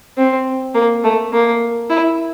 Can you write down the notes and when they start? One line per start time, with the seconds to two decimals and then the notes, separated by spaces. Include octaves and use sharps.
0.17 C4
0.74 A#3
1.04 A3
1.33 A#3
1.90 E4